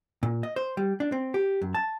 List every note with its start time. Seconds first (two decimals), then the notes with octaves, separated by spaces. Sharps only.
0.23 A#2
0.43 D#5
0.56 C5
0.77 G3
1.00 D4
1.12 C4
1.34 G4
1.62 F#2
1.74 A5